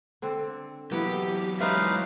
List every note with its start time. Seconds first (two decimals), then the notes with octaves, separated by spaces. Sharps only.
0.22 D3 C4
0.92 E3 F#3 A#3 B3 E4 G4
1.61 G#3 C#4 D#4 B4 C5 D5 E5 F5